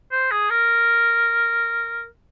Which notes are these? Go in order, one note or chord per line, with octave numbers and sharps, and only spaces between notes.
C5
G#4
A#4